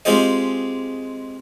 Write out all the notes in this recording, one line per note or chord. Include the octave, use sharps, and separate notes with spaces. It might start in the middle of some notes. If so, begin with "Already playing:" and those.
G#3 C4 F4 G4 D#5